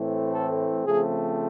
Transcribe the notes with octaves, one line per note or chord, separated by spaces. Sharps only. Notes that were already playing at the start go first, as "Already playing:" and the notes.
Already playing: A2 E3 A3 C4
A4
C#3 F3 A3 C4 G#4